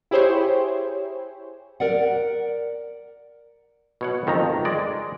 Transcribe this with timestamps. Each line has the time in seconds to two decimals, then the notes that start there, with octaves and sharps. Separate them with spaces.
0.11 E4 G4 G#4 C5 C#5
1.80 A#4 D5 F#5
4.01 B2 C#5 F#5
4.27 F2 D#3 A3 A#5
4.65 G#3 D5